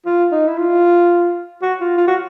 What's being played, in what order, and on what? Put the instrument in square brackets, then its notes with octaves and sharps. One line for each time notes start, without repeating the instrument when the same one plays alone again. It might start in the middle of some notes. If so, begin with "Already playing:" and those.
[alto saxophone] F4
D#4
E4
F4
F#4
F4
F4
F#4